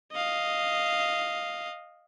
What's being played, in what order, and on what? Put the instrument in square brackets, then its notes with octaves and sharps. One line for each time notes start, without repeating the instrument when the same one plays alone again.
[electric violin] D#5 F5